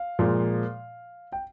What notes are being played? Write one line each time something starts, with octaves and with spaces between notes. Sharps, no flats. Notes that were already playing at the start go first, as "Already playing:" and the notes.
Already playing: F5
A#2 F3 G#3
G5